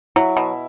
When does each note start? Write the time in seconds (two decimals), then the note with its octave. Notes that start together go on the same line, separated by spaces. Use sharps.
0.16 F#3 E4
0.37 B2